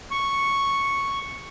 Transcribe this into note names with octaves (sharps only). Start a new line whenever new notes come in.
C#6